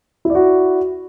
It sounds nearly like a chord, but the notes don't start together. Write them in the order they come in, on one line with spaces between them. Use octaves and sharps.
E4 D5 F#4